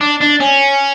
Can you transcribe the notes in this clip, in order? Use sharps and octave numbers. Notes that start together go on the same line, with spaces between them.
D4
D4
C#4